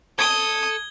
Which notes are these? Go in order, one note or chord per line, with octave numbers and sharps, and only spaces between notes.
A4 D#6 G#6 G7